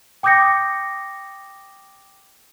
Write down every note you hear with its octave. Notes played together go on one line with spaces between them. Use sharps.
G5 D6 D#6 G6 A#6 C#7